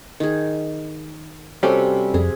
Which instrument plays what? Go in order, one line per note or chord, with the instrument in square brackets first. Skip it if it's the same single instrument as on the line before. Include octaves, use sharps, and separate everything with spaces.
[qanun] D#3 G#4
[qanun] C3 F#4 A4 [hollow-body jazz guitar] G3 C#4 G4
[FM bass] F2 [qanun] G#4